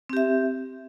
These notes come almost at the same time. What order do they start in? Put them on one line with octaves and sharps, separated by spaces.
C4 G4 E5